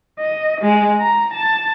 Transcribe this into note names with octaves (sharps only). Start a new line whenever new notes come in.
D#5
G#3
A#5
A5